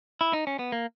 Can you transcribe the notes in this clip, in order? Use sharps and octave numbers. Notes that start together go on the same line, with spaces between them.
E4
D#4
C#4
B3
A#3